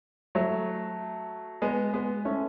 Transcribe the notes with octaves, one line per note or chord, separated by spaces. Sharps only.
F#3 A3
G#3 B3
G#3 B3
A3 C#4